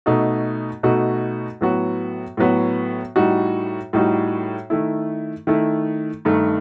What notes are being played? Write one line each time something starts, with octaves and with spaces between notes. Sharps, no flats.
B2 A3 D#4 F#4
B2 A3 D#4 F#4
A2 F#3 B3 F#4
A2 F#3 B3 F#4
A2 G3 D#4 F#4
A2 G3 D#4 F#4
D#3 A3 E4
D#3 A3 E4
G2 D#3 A3 D#4